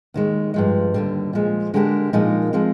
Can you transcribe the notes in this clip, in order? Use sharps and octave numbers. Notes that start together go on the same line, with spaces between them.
D#2 D#3 G#3
G2 F3 G#3
D#2 D3 G3
A#2 F3 G#3
D3 G#3 D4 G4 A#4
A#2 F3 G#3 D#4 A#4
F3 G#3 C4